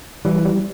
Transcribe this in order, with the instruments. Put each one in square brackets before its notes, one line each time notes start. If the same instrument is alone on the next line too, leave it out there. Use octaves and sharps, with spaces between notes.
[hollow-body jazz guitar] E3 [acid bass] G3
[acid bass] G3